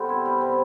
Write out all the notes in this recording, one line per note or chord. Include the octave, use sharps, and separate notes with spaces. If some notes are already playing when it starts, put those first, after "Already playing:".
Already playing: C3 G3 B3 A4 C5
E4
G3
C3